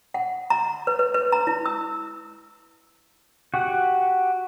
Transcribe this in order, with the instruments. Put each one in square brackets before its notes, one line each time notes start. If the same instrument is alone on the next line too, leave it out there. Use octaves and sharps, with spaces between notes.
[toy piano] F#5
A#5
B4
B4
B4
A#5
E4
E6
[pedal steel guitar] F#4 G4 F#5